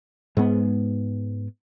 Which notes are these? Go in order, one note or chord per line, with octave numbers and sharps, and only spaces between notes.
G#2 G#3 B3